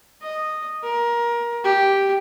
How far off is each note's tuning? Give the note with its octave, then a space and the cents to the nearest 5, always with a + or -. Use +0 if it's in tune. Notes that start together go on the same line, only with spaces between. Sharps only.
D#5 -10
A#4 +20
G4 +0